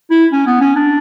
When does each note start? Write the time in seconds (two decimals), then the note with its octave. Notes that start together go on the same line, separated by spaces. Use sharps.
0.11 E4
0.32 C#4
0.47 B3
0.61 C#4
0.76 D4